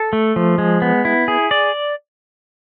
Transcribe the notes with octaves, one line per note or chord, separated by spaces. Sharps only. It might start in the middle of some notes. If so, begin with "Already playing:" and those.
Already playing: A4
A3
F3
G#3
B3
E4
G#4
D5